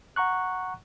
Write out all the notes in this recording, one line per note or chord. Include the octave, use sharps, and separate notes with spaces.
F#5 A#5 C#6 F#6